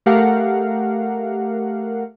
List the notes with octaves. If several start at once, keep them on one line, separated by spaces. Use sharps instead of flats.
A3 G4 A#4 F5 F#5